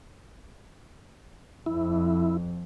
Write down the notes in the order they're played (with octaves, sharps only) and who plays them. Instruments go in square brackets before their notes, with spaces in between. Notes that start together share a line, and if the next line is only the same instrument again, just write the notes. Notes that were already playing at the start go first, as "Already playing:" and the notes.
[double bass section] F2 [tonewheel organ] E4